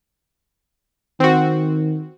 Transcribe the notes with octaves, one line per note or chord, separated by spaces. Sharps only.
D#3 C4 F#4